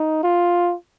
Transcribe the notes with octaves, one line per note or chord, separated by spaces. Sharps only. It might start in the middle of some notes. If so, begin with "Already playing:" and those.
Already playing: D#4
F4